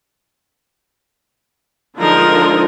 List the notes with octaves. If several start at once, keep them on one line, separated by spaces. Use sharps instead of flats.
D3 F3 G#3 D#4 A#4